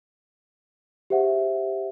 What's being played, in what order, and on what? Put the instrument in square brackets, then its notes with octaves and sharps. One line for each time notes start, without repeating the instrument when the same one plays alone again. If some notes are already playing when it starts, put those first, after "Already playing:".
[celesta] G4 G#4 C5 E5 F#5